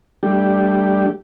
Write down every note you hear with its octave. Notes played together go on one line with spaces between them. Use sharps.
G3 A3 D4 G4